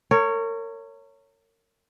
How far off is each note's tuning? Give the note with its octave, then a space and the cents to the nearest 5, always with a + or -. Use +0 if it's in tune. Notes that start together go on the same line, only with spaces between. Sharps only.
A#4 -35 C#5 +0